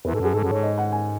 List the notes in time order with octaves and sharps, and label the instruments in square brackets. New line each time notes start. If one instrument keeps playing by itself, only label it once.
[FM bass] E2 [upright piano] B4
[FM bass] G#2 [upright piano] A4
[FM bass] F#2 [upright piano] G#4
[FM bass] G#2 [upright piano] A4
[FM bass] F#2
[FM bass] G#2 [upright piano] C#5
[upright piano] D#5
F#5
G#5